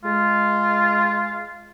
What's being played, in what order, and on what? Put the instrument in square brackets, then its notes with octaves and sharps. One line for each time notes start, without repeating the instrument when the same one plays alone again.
[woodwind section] G#3 F4